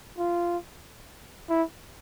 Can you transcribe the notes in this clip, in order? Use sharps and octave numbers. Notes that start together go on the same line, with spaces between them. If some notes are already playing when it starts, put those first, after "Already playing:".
F4
E4